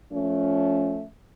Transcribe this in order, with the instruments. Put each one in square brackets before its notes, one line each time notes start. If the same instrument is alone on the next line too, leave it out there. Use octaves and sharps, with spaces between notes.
[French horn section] F3 A3 C#4